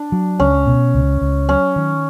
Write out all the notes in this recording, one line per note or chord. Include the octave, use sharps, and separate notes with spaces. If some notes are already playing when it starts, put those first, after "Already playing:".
Already playing: D4
F#3
C#2 C#4
B2
C#2
C#2
F#3 C#4
D#3